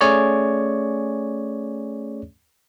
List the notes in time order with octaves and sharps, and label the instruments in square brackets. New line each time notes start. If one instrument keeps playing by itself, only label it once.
[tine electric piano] A3 C#4 G#4 C#5 D5